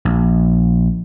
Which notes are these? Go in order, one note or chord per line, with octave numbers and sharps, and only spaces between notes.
A#1